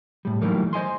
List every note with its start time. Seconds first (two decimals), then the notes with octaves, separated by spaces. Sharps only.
0.25 A2 G3
0.42 D#3 E3 F#3 G3 A3 A#3
0.73 C5 D#5 G#5 C6